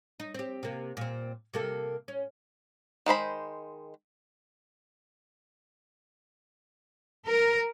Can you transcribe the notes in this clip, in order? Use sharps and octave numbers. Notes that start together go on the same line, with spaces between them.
D#4
C4 G4
C3 A#3
A#2 C4
C3 A#3 A4
C#4
D#3 G#3 C5 B5
A#4